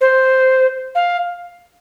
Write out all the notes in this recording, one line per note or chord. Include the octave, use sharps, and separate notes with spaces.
C5
F5